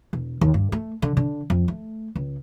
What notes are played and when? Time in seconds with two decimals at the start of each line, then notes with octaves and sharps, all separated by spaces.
0.13 E1
0.41 D#2
0.54 G2
0.72 A3
1.02 D3
1.17 D3
1.50 F2
1.68 A3
2.15 C#2